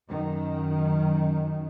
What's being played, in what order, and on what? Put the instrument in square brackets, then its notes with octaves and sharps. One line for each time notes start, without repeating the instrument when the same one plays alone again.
[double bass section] F#2 D#3